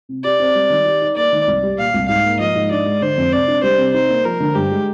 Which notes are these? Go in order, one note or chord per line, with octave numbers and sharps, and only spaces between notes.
C3
G4 D5
C4
G3
D#3
G4
D#4
A#3 D5
D#3
C2
G3
A#2 F5
C2
G#2 F5
A#3
F3 D#5
G#2
D4 D5
G#3
D3 C5
F2
C3 D5
D4
G3 C5
C3
D#4 C5
A#3
F3 A#4
D3
G2 G4
G#3